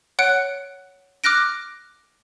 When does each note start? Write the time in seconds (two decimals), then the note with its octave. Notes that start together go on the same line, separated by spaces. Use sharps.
0.19 C#5 F#5 F#6 C#7 D7
1.24 D6 F6 F#6 A#6 D7